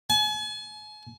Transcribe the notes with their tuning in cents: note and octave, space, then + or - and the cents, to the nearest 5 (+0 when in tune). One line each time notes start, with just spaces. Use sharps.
G#5 +40